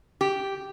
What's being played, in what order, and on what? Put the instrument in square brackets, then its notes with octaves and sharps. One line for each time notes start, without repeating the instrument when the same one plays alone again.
[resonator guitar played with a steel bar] G4